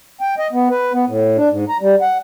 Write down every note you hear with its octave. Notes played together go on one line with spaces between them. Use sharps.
G5
D#5
B3
B4
B3
A2
D4
G#2
A#5
G3
F#5